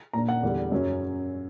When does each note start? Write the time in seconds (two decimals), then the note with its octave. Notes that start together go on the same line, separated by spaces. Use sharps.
0.13 A#2 A#3 D4 A#5
0.29 F#5
0.43 E2 D3 G3
0.72 F#2 C#3 F#3 C#4